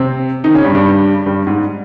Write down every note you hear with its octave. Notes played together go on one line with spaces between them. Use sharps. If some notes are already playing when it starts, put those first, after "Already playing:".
Already playing: C3 C4
D#3 D#4
C#3 C#4
G2 G3
G2 G3
G2 G3
G#2